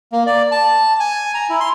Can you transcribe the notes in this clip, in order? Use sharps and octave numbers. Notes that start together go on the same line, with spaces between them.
A#3
D5
A5
G#5
A#5
E4
C6